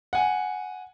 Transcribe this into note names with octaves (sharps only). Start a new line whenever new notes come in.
F#5 G#5